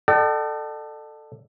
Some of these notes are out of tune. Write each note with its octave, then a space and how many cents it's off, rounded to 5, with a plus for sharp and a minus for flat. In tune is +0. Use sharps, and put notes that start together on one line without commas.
A4 +5 D5 +45 G5 -45